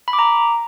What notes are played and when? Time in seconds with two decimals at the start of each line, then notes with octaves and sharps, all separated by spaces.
0.08 B5
0.13 D6
0.19 A#5